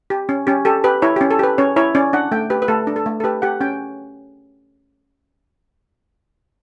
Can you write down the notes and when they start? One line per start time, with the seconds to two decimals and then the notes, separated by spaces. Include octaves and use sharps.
0.10 G4
0.29 C#4
0.47 C#4 G4
0.65 G4 A4
0.84 G4 B4
1.02 E4 C#5
1.16 G4
1.21 C#4
1.31 A4
1.39 G4 B4
1.58 C#4 C#5
1.76 E4 C#5
1.95 C#4 D5
2.13 D4 F#5
2.32 A3 G5
2.50 G4 B4
2.62 B4
2.68 A3 A4
2.87 D4
2.96 A4
3.06 A3
3.20 A4
3.24 G4 B4
3.42 G4 F#5
3.61 C#4 G5